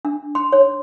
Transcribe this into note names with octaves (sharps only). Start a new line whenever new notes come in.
D4
C6
C#5